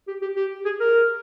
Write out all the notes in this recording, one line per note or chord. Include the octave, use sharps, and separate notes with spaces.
G4
G4
G4
G#4
A#4